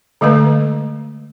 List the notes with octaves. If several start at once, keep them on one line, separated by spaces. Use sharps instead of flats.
D3 G#3 A3 B4